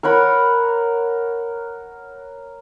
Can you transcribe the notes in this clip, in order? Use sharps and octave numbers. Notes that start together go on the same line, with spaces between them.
A#4 C#5 F#5 B5